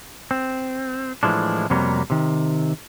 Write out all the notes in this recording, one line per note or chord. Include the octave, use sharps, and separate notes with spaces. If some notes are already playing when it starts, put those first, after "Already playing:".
C4
A2 E3 F3 G#3 D4
F2 C3 F#3 G3 A#3 B3
C3 D#3